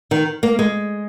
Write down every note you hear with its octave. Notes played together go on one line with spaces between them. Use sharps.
D#3
A#3
G#3